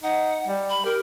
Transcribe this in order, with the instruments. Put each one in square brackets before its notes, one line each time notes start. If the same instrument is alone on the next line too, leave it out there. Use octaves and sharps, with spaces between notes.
[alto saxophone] D#4 [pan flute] F#5
[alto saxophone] G3
[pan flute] B5
[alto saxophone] G4 [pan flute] A#4